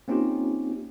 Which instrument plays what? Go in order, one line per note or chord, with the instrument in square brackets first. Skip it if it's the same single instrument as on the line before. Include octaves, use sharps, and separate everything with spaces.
[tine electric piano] A#3 C4 C#4 D#4 F4 G4